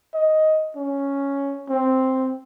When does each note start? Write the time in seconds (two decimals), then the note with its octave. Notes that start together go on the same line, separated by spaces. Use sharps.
0.14 D#5
0.76 C#4
1.69 C4